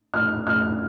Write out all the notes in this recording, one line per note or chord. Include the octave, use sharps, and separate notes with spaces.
F6
F6